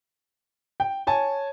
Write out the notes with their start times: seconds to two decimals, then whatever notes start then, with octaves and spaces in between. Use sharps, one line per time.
0.80 G5
1.07 C#5 G#5 A5